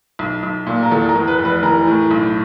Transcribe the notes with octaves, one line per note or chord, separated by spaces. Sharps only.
B1
B1
A#2
A#4
E2 A4
A#4
E2
B4
F1
B4
E3 A#4
A2
B1